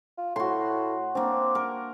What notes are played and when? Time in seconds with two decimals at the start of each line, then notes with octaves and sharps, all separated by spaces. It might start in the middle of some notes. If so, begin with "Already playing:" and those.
0.17 F4
0.36 A2 F#4 C6
1.15 A#3 C4 D4
1.55 A#4